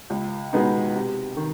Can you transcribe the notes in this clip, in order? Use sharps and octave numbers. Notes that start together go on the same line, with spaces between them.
C#2
B2 G#3 B3 D#4
C3
D#3